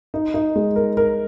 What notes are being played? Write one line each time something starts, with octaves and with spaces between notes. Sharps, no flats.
D#4
D#4
G#3
A#4
A#4